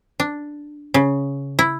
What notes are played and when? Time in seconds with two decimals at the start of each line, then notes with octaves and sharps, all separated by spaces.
0.20 D4
0.94 C#3
1.59 E4